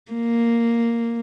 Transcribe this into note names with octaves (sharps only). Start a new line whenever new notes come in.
A#3